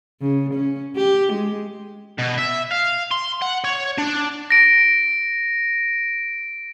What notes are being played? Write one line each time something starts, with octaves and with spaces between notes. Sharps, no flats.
C#3
C#4
G4
G#3
B2
E5
F5
C6
F#5
C#5
D4
A#6 D7